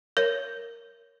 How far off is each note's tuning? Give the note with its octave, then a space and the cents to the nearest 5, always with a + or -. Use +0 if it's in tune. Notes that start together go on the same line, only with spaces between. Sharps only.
A#4 +0 C#5 +0